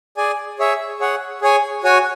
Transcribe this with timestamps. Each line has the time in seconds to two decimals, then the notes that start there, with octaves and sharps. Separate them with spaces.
0.17 G#4 D5 G#5
0.59 G#4 C#5 E5
1.00 G#4 C#5 F#5
1.41 G#4 C#5 G#5
1.84 F#4 C#5 G#5